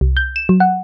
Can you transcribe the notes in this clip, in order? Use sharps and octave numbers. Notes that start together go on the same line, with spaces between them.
C2
G6
E7
F#3
F#5